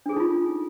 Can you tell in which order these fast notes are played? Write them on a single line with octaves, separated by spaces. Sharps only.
D4 G#4 A4 D#4 F4